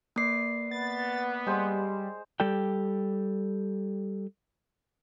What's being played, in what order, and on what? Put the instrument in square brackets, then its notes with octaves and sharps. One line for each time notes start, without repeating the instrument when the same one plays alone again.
[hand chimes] A#3 C7 [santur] B4 D5
[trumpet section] B3 [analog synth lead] A6
[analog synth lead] G3 [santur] G#3 C5
[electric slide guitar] G3 G4 A4 D5 G5